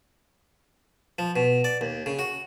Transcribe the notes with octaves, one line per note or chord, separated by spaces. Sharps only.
F3
B2
D5
D#2
C#3
F#4